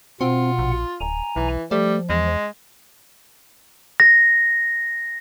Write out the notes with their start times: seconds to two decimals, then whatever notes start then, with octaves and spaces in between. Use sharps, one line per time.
0.21 B2 C4 F4 F#5
0.59 A#1
1.01 D1 G#5 A#5
1.36 B1 E3
1.71 F3 G3 A3
2.10 E2 G#3
4.00 A#6